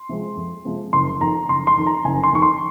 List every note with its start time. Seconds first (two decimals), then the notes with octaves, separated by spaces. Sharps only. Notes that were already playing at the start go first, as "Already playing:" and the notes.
Already playing: C6
0.09 C3 F3 G#3 C4
0.37 F2
0.65 C3 F3 G#3 C4
0.93 F#1 C6
1.21 F2 D#3 A#5
1.49 F#1 C6
1.67 C6
1.77 F2 D#3
1.86 A#5
2.05 F#1 G#5
2.23 C6
2.33 F2 D#3 C#6
2.42 C6